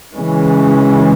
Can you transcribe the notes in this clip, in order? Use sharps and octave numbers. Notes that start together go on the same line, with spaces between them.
C#3 E3 G#3 C#4